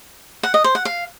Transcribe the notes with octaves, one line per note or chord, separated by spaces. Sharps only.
F#5
D#5
C5
F#5
F5